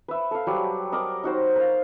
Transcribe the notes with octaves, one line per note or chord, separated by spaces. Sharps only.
B4 E5
A4 F5
F#3 G3
A#4 D5 D#5
D#4 F#4 C5
A#4 F5